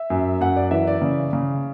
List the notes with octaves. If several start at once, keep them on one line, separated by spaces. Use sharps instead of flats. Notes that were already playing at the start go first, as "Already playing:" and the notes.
Already playing: E5
F#2
F#2 F#5
D5
E3 E5
D5
C#3
C#3